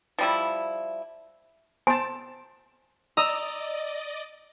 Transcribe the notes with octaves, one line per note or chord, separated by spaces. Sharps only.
F3 G3 E4
C5 G#5 A5
D5 D#5 A#5 D#6 E6